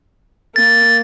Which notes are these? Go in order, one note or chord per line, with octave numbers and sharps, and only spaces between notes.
A#3 A6